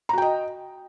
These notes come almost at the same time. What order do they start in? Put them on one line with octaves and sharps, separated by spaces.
A#5 F#4 G5 D#5